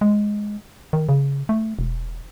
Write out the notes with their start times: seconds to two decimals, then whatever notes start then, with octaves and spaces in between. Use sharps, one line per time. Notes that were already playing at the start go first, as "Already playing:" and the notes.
0.01 G#3
0.93 D#3
1.09 C#3
1.49 A3
1.79 E1